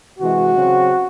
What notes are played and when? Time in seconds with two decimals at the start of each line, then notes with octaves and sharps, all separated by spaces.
0.19 C3 E3 G#3 F#4
0.54 C#3 F#3 C4